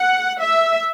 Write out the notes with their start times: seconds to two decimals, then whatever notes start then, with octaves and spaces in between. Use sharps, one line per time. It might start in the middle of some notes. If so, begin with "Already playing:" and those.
Already playing: F#5
0.41 E5